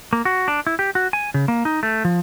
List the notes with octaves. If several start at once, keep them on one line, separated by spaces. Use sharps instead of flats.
A#3
F#4
D4
E4
G4
F#4
G#5
C#3
A#3
D#4
A3
F3